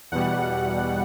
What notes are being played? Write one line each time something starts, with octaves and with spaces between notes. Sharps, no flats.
E2 B2 G3 F#5